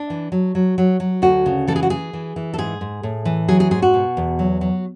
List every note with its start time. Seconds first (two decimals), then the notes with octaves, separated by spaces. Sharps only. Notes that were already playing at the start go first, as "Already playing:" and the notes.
Already playing: D4
0.10 E3
0.32 F#3
0.55 F#3
0.78 F#3
1.00 F#3
1.22 D2 F#4
1.46 C#3
1.68 E3 A4
1.76 G#4
1.83 F#4
1.90 E3 G#4
2.13 E3
2.36 E3
2.54 A4
2.58 G#2 G#4
2.81 G#2
3.03 A2
3.25 E3
3.48 F#3 G#4
3.60 G#4
3.71 G#2 G#4
3.82 F#4
3.94 B2
4.17 E2
4.39 F#3
4.61 F#3